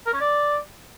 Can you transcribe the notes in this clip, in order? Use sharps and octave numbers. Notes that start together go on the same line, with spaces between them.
A#4
C#4
D5